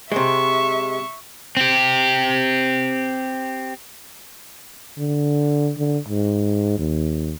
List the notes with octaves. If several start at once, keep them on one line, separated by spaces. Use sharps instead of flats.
C3 G#3 E5 C#6
C4 G4
D3
D3
G#2
D#2